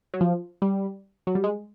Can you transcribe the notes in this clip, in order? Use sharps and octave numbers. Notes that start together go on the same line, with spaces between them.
F#3
F3
G3
F#3
G3
G#3